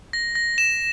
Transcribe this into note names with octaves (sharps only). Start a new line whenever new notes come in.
A#6
A#6
E7